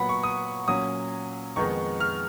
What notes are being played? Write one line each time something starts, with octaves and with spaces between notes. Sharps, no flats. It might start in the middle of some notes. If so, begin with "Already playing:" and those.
Already playing: A#2 F#3 B3 F#5 B5
C#6
D#6
A#2 F#3 C#4 D#6
F2 D#3 G#3 B3 D#4 C#6
F6